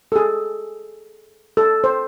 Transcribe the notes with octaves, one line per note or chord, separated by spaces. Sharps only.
A4
G#4
A4
C5